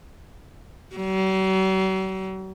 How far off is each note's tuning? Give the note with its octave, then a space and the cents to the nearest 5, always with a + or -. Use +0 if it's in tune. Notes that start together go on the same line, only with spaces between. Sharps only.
F#3 +45